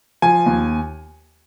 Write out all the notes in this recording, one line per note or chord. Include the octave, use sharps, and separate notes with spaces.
F3 G#5
D#2